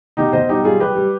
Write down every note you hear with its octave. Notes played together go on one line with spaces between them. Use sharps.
B2 D#4 G4
B2 C5 D#5
G3 D#4 G4
G3 F4 G#4
G3 G4 B4
G3